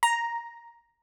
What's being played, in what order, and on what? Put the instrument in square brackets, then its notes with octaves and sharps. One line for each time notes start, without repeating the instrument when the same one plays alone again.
[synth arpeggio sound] A#5